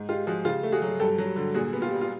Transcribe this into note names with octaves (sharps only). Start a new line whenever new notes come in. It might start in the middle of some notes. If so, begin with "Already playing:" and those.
Already playing: G#2
G#3 F4 G4
F3 F#4 G#4
C#3 F4 G4
A3
F#4 G#4
F#3
G2 G4 A4
F#3
D3
A#2 F#4 G#4
B3
F4 G4
G3
F4